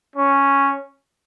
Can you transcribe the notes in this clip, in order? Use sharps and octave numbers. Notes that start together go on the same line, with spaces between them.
C#4